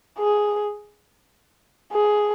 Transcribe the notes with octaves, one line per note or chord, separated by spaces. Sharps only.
G#4
G#4